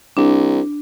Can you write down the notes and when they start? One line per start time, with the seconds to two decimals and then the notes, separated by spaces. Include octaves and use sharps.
0.17 C2 D4